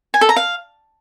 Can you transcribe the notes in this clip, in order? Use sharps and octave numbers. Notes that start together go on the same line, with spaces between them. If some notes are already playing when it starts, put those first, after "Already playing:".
G#5
A4
A#5
F5